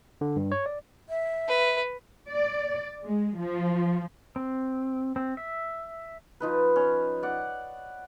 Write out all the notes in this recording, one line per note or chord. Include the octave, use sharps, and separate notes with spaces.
D3
G2
C#5
D5
E5
B4
D5
G#3
F3
C4
C4
E5
F3 D#4 B4
C#4
D5 F#5